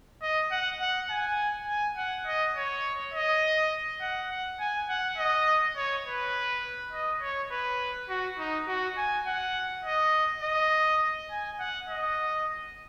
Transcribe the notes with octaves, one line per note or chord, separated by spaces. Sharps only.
D#5
F#5
F#5
G#5
G#5
F#5
D#5
C#5
D#5
F#5
F#5
G#5
F#5
D#5
C#5
B4
D#5
C#5
B4
F#4
D#4
F#4
G#5
F#5
D#5
D#5
G#5
F#5
D#5